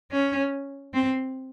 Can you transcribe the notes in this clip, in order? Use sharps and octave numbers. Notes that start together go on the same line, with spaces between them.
C#4
C4